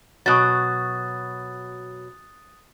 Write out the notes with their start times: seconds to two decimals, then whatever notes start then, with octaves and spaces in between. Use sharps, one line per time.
0.26 B2 F#3 D#6 F#6 A6